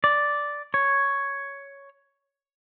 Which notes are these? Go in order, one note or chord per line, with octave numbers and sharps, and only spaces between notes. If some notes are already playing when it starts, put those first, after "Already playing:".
D5
C#5